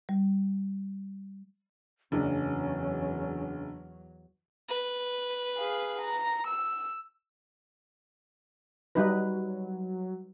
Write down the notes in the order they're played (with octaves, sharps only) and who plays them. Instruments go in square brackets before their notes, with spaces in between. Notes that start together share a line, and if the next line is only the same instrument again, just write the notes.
[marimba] G3
[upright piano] F#1 [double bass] E2 F#3 [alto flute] C#4 [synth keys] D4
[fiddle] B4
[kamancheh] G#4 F5
A#5
E6
[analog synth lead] F#3 [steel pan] G3 D#4 B4